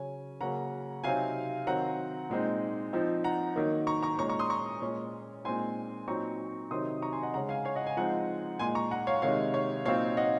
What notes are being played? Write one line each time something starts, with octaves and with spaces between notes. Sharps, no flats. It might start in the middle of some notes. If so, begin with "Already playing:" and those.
Already playing: C#3 F#3 C#4 G#5
C#3 F#3 A#3 C#4 F#5 A#5
C3 F#3 C4 D#4 F5 G#5
D#3 F#3 C4 F#5 A#5
A#2 G#3 C4 D#4
F3 C4 D#4
F#5 A#5
D#3 F#3 A#3 D#4
A#5 C#6
A#5 C#6
A#2 G#3 C#4 A#5 C#6
A#5 C#6
C6 D#6
A#5 C#6
A#2 G#3 C#4
A#2 G#3 C4 D#4 G#5 C6
A#2 F#3 C4 D#4 A#5 C#6
C3 D#3 F#3 C4 D#4 C6 D#6
A#5 C#6
G#5 C6
D#5 F#5
C#3 G#3 C#4 F#5 A#5
F5 G#5
C#5 F5
D#5 F#5
F5 G#5
F3 G#3 C4 D#4 F#5 A#5
A#2 G#3 D#4 G#5 C6
A#5 C#6
F#5 A#5
C#5 F5
C3 D#3 G#3 D#4 C#5 F5
C#5 F5
A#2 F#3 C4 D#4 C#5 F5
D#5 F#5